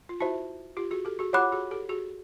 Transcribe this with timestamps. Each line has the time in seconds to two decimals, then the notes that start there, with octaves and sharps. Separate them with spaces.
0.09 F4
0.20 E4 F#4 C5 E5 A5
0.77 F4 G4
0.91 F#4 G#4
1.05 G4 A4
1.19 F#4 G#4
1.33 F4 G4 C#5 F#5 B5 D6 F#6
1.52 F#4 G#4
1.71 G4 A4
1.89 F#4 G#4